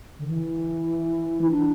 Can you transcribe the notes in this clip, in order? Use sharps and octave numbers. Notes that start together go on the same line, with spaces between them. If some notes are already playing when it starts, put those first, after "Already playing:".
D3
E3
E4
D4